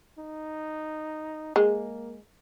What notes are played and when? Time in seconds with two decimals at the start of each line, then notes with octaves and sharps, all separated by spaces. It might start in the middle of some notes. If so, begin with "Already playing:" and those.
0.19 D#4
1.56 G#3 A#3